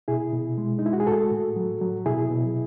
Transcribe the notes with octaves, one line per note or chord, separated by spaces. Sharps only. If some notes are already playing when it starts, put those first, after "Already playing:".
B2 E4 G#4
B2
G#3
D#4
G#3 E4
F#4
G#4
A2 F#4 A4
A2
F#3
F#3
B2 E4 G#4
B2